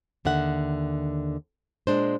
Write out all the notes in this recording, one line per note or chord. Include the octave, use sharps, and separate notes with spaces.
D#2 D3 E5 F#5
A#2 G#3 D4 C5